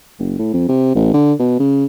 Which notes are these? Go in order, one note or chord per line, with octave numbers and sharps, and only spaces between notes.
F#1
A2
F2
C3
A1
D3
B2
C#3